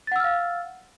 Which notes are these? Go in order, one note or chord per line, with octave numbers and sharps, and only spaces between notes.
F5 F#5 E6 F6 A6